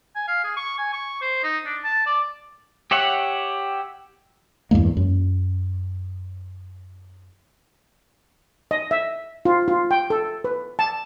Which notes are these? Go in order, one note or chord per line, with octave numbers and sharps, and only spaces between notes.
G#5
F5
G#4
C#6
G#5
C#6
C5
D#4
D4
A5
D5
G4 C#5 E5 F#5
E2 G2 G#3 A#3
F#2
D#5
E5
F4
F4
G5
A4
B4
A5